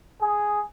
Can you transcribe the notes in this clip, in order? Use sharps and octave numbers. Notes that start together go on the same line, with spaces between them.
G#4